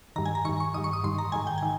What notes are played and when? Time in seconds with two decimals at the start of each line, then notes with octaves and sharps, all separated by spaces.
0.16 G2 D#3 A#5
0.26 G#5
0.35 A#5
0.45 G2 D#3 C#6
0.60 C#6
0.74 G2 D#3 D#6
0.84 C#6
0.93 D#6
1.04 G2 D#3 C6
1.18 A#5
1.32 G#2 D#3 G#5
1.47 G5
1.58 D#3 G#5